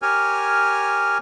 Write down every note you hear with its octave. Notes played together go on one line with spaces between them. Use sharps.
G4 A#4 C#5 G#5 F6